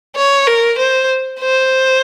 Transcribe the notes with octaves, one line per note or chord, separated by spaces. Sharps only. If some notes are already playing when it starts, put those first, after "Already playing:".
C#5
A#4
C5
C5